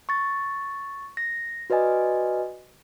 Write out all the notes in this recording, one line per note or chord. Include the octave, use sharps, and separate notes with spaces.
C#6 A6
A#6
F#4 B4 D5 D#5 G#5